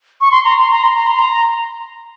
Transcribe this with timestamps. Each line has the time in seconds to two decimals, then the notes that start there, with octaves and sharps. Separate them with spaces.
0.21 C#6
0.31 C6
0.45 A#5
0.59 C6
0.72 A#5
0.84 C6
0.96 A#5
1.07 C6
1.19 A#5